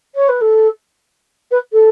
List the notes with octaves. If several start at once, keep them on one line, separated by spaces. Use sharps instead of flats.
C#5
B4
A4
B4
A4